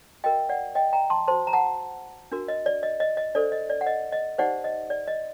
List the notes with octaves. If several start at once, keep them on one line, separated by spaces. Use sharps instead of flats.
F#4 A#4 D#5 G5
D5 F#5
D#5 G5
G5 A#5
A5 C6
F#4 C5 A5 C6
A#5
F#5 A5
D4 F#4 A#4
D#5
D5
D#5
D#5
D#5
D4 A4 C5 D5
D#5
D5
F#5
D#5
D#5
D#4 G4 C5 D5 F#5
D#5
D5
D#5